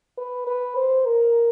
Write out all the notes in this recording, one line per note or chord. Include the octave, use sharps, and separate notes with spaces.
B4
B4
C5
A#4